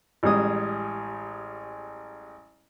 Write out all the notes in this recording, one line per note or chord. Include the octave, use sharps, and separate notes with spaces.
A1 G3 G#3 D#6